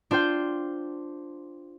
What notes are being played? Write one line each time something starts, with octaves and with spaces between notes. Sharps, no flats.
D4 F4 C5 G5